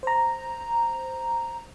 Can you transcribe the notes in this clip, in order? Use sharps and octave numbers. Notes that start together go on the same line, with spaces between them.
C5 A#5